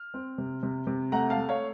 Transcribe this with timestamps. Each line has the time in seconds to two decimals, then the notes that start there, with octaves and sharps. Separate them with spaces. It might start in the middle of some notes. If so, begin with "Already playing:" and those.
Already playing: F6
0.14 C4
0.38 C3
0.63 C3
0.87 C3
1.12 A3 F#5 A#5
1.30 F5 A5
1.37 A3
1.49 C#5 F5